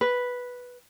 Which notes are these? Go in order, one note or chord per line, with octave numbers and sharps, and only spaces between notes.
B4